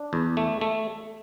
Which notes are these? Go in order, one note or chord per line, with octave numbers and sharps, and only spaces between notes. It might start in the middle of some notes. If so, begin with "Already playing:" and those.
Already playing: D4
E2
A3
A3